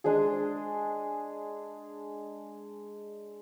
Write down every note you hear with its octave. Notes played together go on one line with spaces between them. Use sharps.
G#3 D4 G#4